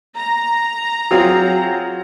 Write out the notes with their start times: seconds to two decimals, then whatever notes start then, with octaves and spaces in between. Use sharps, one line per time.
0.16 A#5
1.11 F#3 C4 F4 G#4